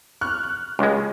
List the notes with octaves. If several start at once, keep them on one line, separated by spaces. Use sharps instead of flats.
C#6 F6 F#6
F#6
C#2 G#3